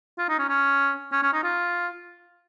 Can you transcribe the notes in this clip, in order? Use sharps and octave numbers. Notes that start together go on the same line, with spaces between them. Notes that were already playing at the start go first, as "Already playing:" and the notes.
F4
D#4
C#4
C#4
C#4
C#4
D#4
F4